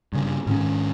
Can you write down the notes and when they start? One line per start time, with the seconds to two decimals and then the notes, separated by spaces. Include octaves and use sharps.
0.13 G2 C#3
0.47 G#2 D#3 C#4